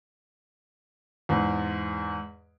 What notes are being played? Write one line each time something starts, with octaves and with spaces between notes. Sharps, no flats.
E2 G#2